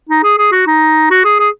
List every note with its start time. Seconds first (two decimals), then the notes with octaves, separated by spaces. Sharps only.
0.09 D#4
0.23 G#4
0.38 G#4
0.52 F#4
0.67 D#4
1.10 F#4
1.24 G#4
1.39 G#4